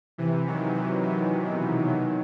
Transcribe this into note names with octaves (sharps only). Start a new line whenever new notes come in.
C3 E3
D#3 F#3
C3 E3
C3 E3
B2 D#3
D#3 F#3